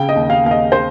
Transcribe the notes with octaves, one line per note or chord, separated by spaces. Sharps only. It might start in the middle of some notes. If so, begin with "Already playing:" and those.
Already playing: C#3 G5
D#5
D#2
F5
D#2 F5
D#5
C5